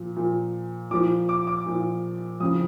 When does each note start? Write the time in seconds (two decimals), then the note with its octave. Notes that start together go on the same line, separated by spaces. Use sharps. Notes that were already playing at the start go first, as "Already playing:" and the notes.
Already playing: A#2 F3
0.16 A#2 F3
0.91 A#2 D6
0.94 F3
1.29 D6
1.47 D6
1.66 A#2 F3
2.40 F2 C#3 F3 D#6